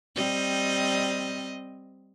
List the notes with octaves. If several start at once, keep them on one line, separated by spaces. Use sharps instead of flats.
G3 C4 D#5